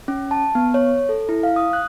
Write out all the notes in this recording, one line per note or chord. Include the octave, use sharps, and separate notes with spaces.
C#4
A5
B3
C#5
A4
E4
F5
D#6
F#6